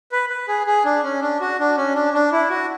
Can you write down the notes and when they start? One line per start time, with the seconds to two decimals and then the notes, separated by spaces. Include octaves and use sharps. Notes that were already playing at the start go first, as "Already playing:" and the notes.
0.12 B4
0.30 B4
0.48 G#4
0.67 G#4
0.85 D4
1.04 C#4
1.21 D4
1.41 F#4
1.59 D4
1.77 C#4
1.95 D4
2.13 D4
2.32 E4
2.50 F#4